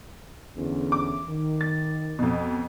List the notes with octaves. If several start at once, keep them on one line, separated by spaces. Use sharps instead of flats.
E2 D3 C#4
D6
D#3
A6
F2 B2